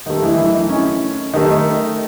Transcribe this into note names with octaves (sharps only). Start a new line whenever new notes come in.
D#3 A3 D#4
E3 E4
E3 E4
D#4
C#4
D#3 A3 D#4